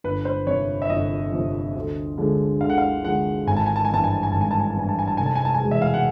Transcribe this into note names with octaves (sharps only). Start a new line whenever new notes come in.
G1 B4
C5
F2 C3 F3 C#5
E5
G1 D#5
F2 C3 F3
D2
D3 F3 G#3
D2 F5
F#5
F5
D3 F3 G#3 F#5
G#1 G#5
A5
G#5
A5
G#5
G2 E3 A5
G#5
A5
G#5
G#1 A5
G#5
A5
G#5
A5
G2 E3 G#5
A5
G#5
A5
F1 G#5
A5
G#5
A5
G#5
E2 B2 G#3
E5
F5
F#5